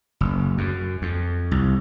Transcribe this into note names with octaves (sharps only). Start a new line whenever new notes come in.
F#1
F#2
F2
C2